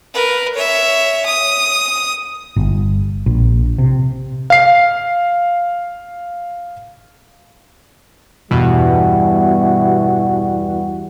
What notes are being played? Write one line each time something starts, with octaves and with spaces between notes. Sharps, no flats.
A#4 B4
C#5 E5
D#6
G1
A#1
C3
F5 C7
E2 G2 B2 E3 G3 F#4